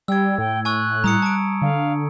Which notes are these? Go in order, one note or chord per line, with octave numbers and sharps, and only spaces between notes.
G3 G5 E6 G#6
A2 G5
G#5 C#6 E6 F#6
G3 A#5 D#6 C#7
A5 D7
D3 F5